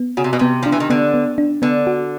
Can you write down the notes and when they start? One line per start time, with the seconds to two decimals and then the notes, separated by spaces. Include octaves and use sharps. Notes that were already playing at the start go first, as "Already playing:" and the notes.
Already playing: B3
0.17 C#3 F#4
0.24 C3
0.33 B2
0.39 C3 B3
0.63 F3 D4
0.72 E3
0.80 D#3
0.90 D3 B3
1.14 B3
1.38 D4
1.62 D3 B3
1.87 F#4